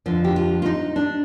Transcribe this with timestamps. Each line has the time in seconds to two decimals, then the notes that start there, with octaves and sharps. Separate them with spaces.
0.06 F2 D3 F3 F4
0.24 G4
0.36 F4
0.62 F4
0.66 D#4
0.96 D4